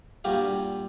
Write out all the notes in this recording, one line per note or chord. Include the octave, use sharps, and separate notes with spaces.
G2 A#2 F#4 G4 F5